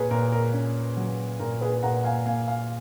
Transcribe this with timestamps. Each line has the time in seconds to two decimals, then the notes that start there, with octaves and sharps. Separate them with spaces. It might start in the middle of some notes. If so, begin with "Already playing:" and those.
Already playing: A#2 G#4 A#4 B4 C#5
0.11 A#2 A#4
0.32 A#4
0.53 C#4
0.97 F#3
1.40 A#2 A#4
1.61 G#4 B4
1.83 A#2 F#5 A#5
2.04 F5 G#5
2.25 A#3 F5 G#5
2.47 F5 G#5